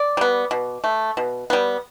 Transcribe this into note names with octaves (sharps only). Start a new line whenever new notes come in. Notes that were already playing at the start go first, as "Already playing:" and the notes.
Already playing: D5
G3 B3
B2
A3
B2
G3 B3